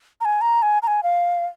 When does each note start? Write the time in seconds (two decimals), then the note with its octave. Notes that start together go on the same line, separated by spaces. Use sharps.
0.21 A#5
0.25 G#5
0.41 A#5
0.62 G#5
0.83 A#5
0.87 G#5
1.03 F5